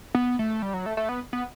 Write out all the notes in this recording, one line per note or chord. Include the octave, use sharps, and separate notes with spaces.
B3
A3
G3
F#3
A3
A3
B3
B3